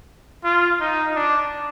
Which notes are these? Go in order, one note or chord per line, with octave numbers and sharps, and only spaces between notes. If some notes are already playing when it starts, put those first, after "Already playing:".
F4
D#4
D4